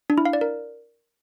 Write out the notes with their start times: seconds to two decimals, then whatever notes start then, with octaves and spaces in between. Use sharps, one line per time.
0.10 D4
0.18 E4
0.25 F5
0.33 D5
0.41 A#4